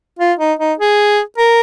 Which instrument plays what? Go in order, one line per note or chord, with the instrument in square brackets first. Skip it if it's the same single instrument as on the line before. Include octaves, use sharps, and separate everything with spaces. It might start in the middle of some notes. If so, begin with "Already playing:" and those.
[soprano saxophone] F4
D#4
D#4
G#4
A#4